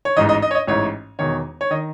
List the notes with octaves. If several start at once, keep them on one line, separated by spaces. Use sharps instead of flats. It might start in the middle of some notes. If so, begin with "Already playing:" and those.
C#5
A1 G#2 E3 D#5
D#5
D#5
C#5
D#5
A1 G#2 E3 C#5
E1 E2 D#3 C#5
C#5
D#3 D#5